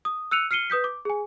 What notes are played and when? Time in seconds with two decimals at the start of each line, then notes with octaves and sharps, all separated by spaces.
0.05 D#6
0.31 E6 F#6 C#7 D#7 F7
0.51 F6 C7 C#7 D#7 G7
0.70 B4 D#6 G6 B6
0.84 D6
1.05 G#4 G#5